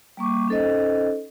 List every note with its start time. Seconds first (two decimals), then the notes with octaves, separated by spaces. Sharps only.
0.17 G3 A#3 C#6 D6
0.48 C#4 D#4 A4 C5 D#5